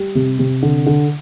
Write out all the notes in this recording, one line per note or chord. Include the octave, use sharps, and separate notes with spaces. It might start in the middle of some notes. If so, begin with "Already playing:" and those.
Already playing: G3
C3
C3
D3
D3